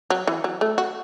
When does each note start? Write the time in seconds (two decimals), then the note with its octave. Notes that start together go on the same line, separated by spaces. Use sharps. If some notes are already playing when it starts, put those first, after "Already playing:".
0.10 F#3
0.27 E3
0.44 F#3
0.61 A3
0.78 F#4